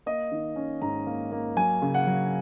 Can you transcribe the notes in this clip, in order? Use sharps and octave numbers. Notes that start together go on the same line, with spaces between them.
A#3 D#5
D#3
C#4
G#2 A#5
A#3
A#3
F#3 G#5
C#3
F#5
F#3